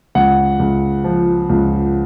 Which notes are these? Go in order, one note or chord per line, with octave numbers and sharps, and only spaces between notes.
C#2 F#5
C#2
F3
C#2